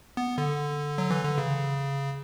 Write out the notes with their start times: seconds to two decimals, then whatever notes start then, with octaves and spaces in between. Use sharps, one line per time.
0.17 B3
0.38 D3
0.98 F#3
1.11 E3
1.25 D3
1.38 C#3